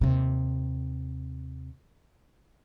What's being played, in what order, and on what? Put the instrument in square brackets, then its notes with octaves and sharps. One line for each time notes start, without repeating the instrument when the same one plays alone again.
[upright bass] D#2 C3